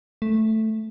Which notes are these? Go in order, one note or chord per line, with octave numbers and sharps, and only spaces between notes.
A3